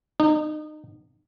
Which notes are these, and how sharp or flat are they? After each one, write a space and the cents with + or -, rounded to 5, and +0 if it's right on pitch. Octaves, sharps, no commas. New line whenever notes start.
D#4 -30